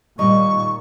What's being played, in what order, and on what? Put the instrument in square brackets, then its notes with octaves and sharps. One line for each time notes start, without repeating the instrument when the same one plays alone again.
[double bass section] A#2 [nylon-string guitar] D#3 G3 [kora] D#4 [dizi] C#6